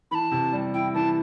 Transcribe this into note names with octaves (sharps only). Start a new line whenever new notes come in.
E3 A5 B5
C3
G3
E4 G5
E3 A5